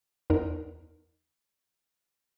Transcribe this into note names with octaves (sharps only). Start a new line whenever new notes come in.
E2 D#4 A#4